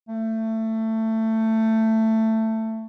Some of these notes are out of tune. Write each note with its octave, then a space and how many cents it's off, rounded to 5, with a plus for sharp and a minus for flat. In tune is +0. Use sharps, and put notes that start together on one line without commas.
A3 +15